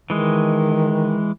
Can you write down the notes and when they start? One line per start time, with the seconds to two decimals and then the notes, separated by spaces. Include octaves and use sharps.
0.10 D#3 E3 G#3